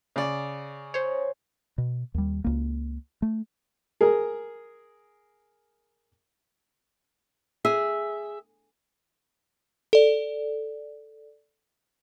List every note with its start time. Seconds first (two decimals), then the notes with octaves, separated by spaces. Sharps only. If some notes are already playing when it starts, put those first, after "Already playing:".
0.16 C#3 D5
0.94 C5 C#5
1.78 B2
2.14 D#2 G3
2.44 C#2 A#3
3.22 A3
4.01 G#4 A#4
7.65 G#4 E5
9.93 A4 D5